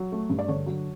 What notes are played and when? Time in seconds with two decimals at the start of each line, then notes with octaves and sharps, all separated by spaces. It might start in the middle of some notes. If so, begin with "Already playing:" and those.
Already playing: F#3
0.12 A3
0.30 G2
0.39 D5
0.48 D3 C#5
0.66 F#3